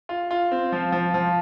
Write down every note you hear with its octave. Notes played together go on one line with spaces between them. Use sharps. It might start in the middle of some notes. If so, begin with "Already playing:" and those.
F4
F4
C4
F3
F3
F3